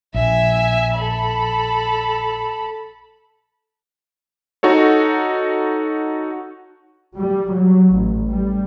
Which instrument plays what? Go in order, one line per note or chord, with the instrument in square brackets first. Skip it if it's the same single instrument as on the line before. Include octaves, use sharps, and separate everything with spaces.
[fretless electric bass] A#1 [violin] E5 G#5
[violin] A4 B5
[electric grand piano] D#4 F#4 A4 C#5
[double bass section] G3
F#3
A1
G3